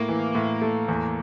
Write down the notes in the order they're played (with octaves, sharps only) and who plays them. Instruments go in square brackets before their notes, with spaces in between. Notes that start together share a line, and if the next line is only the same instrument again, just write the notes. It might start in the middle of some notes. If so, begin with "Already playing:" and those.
Already playing: [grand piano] A2 [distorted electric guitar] A#3
[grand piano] E3
A2
A3
E2